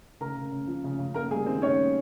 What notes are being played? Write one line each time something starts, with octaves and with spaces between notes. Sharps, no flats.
C#3 A#4 A#5
C#3
C#3
F3
C#3
C#3
A#3 A#4 A#5
G3 G#4 G#5
D#3 C4 C5
D#3 C#4 C#5
G3